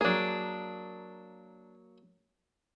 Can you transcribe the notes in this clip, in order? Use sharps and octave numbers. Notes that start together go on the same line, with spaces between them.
F#3 A#3 D4 G#4